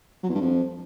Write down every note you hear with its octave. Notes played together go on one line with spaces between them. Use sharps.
F#3
E2
G2
F2